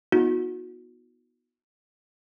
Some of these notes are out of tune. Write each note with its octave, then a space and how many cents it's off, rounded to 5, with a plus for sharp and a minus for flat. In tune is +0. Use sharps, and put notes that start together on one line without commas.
B3 -10 D#4 +30 F#4 -30